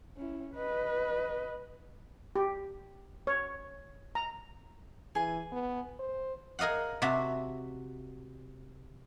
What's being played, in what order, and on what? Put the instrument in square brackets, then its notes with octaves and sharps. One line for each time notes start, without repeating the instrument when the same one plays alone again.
[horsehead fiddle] C#4 E4
B4 D#5
[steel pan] G4
C#5
A#5
[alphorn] E3 [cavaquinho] G#4 G#5
[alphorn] B3
C5
[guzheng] G#4 A#4 D#5 F5 F#5
C3 F#4 E5 A5 C6